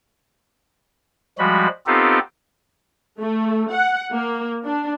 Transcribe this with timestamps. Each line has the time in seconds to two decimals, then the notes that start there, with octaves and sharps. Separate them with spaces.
1.38 F3 G3 G#3 F#4 B5
1.87 B3 C4 D#4 F4 G4 A4
3.20 A3
3.73 F#5
4.11 A#3
4.65 D4